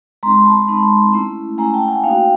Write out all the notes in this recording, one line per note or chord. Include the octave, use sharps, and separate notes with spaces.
G#3 C4 D#4 A#5 C6
A5 B5
G#3 C4 D#4
A3 C#4 E4
A3 C#4 E4 G#5 A#5
G5 A5
F#5 G#5
A#3 D#4 F#4 F5 G5